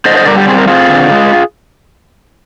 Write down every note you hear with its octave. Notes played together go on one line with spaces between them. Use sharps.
D3 C5 D#5
C5 D#5
G3 A#4 D5
G4
C4 G#4
A#4
C4 F4 G#4
D3
G#3